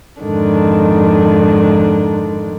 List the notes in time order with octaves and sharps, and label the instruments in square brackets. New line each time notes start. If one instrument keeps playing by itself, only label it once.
[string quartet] F2 G#2 D3 D#3 D4